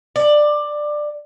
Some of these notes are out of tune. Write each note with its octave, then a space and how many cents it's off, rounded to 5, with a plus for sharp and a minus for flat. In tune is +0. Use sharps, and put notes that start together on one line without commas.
D5 +15